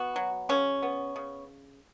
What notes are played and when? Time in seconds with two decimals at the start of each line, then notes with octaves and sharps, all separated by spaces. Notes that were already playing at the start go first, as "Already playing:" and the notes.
Already playing: B3 F#4
0.16 F#3
0.49 C#3 C#4
0.82 B3
1.16 C#3